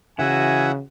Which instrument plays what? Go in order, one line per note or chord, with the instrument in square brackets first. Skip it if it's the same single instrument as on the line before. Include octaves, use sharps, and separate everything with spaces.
[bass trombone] C#3 [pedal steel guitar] E3 F#4 [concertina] E5 F#5 [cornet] G#5